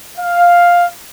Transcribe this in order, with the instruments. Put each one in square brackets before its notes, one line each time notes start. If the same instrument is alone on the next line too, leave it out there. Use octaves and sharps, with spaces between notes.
[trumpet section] F5